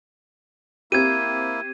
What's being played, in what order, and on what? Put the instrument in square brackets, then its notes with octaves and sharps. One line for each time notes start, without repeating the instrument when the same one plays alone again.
[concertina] A#3 E4 [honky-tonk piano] C4 G4 [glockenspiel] G#6 D#7